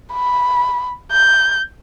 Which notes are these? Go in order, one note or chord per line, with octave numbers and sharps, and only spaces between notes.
B5
G6